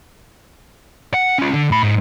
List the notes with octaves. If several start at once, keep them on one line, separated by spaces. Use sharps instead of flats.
F#5
C#4 F4
D3
A2 B5
G#2